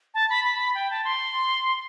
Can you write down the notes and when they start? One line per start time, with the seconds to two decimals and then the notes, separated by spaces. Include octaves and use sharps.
0.14 A5
0.30 B5
0.45 B5
0.60 B5
0.75 G5
0.90 A5
1.05 C6